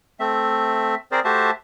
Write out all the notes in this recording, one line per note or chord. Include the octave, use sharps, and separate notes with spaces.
A3 C4 E5
C4 G#4 A#4 C5 D5
A3 F#4 G4 C5 E5 A5